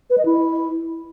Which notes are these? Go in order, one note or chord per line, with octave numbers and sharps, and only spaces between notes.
B4
D#5
E4